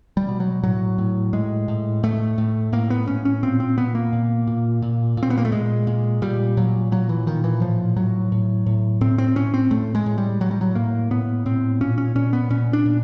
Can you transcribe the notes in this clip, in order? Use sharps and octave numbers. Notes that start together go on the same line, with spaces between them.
G3
B2
F#3
A2 F#3
A2
A2 G#3
A2
A2 A3
A2
A2 A#3
B3
A2 C#4
C#4
A#2 C4
C4
A#2 B3
A#3
A#2
A#2
A#2
A#2
C4
B3
A#3
A3
A#2 G#3
A#2
A#2 G3
A#2 F#3
A#2 F#3
E3
A#2 D#3
E3
A2 F3
A2 F#3
A2
A2
A2 C4
C4
A2 C#4
C4
A2 A3
G#3
A2
G3
A2 F#3
G3
F#3
A2 A#3
A2 B3
A2 C4
A#2 C#4
C#4
A#2 C#4
B3
A#2 C#4
D4
A#2